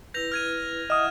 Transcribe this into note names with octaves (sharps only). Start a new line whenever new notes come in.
E4 B4 G6 A#6 F7
F6 G#6 D#7
E4 D#5 E5 F#5 D#6 F6 E7